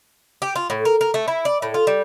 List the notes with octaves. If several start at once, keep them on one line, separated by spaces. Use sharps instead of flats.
G4
F4
A2
A#4
A#4
A3
E4
D5
A2
F4
G3